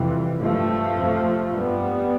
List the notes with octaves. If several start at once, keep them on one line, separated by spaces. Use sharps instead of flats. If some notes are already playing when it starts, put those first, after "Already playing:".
Already playing: F2 C3 E3 G3
G2 F3 A3
F2 C3
G2 G3 B3